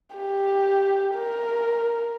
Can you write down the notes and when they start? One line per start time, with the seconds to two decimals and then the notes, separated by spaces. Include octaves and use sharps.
0.16 G4
1.15 A#4